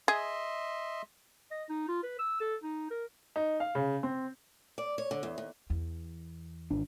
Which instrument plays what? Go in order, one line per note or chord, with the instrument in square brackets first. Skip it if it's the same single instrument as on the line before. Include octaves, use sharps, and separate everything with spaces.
[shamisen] G#4 [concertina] D#5 E5 C6
[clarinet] D#5
D#4
F4
B4
E6
A4
D#4
A#4
[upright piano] D#4
F5
C#3
C4
[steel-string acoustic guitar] D5
C#5
D3
E2
D#2
[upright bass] E2
[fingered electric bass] G#1 D4